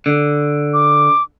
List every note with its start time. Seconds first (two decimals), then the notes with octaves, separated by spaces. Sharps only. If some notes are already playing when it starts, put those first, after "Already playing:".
0.06 D3
0.74 D6